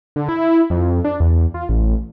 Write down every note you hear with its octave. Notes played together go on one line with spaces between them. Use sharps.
D3
E4
F2
D4
E2
F4
A1